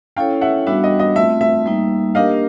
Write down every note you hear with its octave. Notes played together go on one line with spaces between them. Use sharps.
C#4 E4 A4 C#5 F5 G5
E5 F#5
G3 B3 D4 F#4 E5
D#5
D#5
A3 C4 F4 E5
E5
G3 A#3 D#4
A#3 D4 G4 A#4 D#5 F5